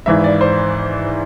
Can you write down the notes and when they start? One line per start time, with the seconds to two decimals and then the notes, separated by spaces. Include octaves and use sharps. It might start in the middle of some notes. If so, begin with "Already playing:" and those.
0.06 G#1 G#2 E3 E5
0.24 D5
0.41 C5